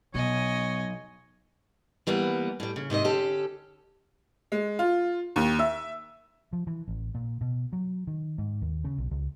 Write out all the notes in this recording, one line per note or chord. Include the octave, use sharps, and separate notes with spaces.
B1 B2 C#5 D#5 G#5
E3 G3 A#3 B3
A2 G3
C#3
G#2 C3 D#3 D#5
D3 C#4 G4 A4
G#3
F4
D#2
E5
F3
E3
A1
A#2
B2
F#3
D#3
G#2
D#2
C#3
B1
C#2